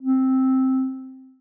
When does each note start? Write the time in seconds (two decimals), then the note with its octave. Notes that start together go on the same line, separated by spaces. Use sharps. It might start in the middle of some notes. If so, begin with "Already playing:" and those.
0.02 C4